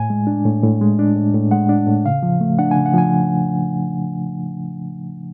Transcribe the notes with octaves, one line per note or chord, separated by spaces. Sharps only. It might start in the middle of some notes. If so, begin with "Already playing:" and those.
Already playing: A2 G#5
G#3
D4
A2
A2
G#3
D4
A2
A2
G#3 F#5
D4
A2
C#3 F5
F3
A3
D4 F#5
G#5
C#3
F#5
F3 G#5